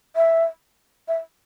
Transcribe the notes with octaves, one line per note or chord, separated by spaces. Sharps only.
E5
E5